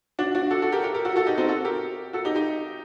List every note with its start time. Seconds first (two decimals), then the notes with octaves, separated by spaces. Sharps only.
0.19 D4 F#4
0.35 D4 F#4
0.51 F#4 A4
0.62 F#4 A4
0.72 G4 A#4
0.84 G4 A#4
0.94 G4 A#4
1.05 F#4 A4
1.16 F#4 A4
1.27 D#4 G4
1.38 C4 D#4
1.48 F#4 A4
1.65 G4 A#4
2.13 F#4 A4
2.25 D#4 G4
2.35 D#4 G4